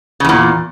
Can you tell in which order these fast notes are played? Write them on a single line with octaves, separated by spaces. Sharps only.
C#3 E2 A#2